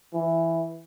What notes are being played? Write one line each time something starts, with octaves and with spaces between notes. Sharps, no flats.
E3